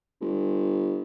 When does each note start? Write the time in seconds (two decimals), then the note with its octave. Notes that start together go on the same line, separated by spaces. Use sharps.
0.21 G1